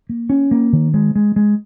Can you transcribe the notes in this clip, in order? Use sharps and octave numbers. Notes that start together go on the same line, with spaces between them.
A#3
C#4
A#3
D#3
G#3
G#3
G#3